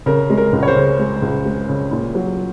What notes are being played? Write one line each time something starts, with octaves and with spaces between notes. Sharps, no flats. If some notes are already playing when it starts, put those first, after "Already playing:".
C#3 A#4
G#3
A#4
C#2
C#5
C5
C#3
G#3
C#2
G#3
C#3
A#2
F#3